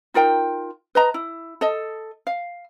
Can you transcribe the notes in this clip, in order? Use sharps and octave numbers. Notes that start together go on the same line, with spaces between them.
D#4 F4 A#4 G5
B4 D#5 A#5
E4
A4 D#5
F5